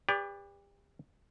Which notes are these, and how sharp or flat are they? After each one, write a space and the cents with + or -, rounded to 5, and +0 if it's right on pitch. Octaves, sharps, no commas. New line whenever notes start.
G4 +35 B4 +0 D5 -15